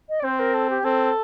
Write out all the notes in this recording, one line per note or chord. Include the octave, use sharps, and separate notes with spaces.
D#5
D5
C4 C5
A#4
A4
G4
C4 A4